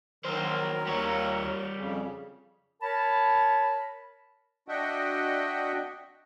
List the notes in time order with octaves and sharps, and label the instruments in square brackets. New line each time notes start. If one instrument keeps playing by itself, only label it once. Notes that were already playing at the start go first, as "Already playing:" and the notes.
[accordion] D#3 F#3 [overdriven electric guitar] A#3 C5 [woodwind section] A#4
[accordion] D#2 [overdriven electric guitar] G3 C#5
[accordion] F2 C#3
[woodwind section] A#4 C#5 A5 B5
[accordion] D4 F#4 D#5 E5 F#5 G5